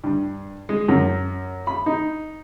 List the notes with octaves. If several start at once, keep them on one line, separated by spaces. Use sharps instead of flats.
G2
G#3
F#2
B5
D#4